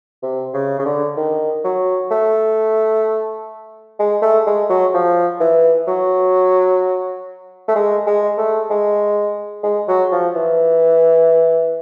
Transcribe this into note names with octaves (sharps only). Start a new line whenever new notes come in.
C3
C#3
C#3
D3
D#3
F#3
A3
G#3
A3
G#3
F#3
F3
E3
F#3
A3
G#3
G#3
A3
G#3
G#3
F#3
F3
E3